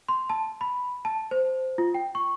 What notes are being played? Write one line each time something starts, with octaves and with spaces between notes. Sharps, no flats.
C6
A5
B5
A5
C5
F4
G5
C#6